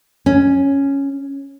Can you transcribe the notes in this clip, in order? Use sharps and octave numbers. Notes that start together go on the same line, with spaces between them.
C#4